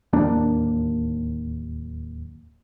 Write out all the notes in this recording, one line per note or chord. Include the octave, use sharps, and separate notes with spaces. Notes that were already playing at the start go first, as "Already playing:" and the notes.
D1 D#2 A#3 D4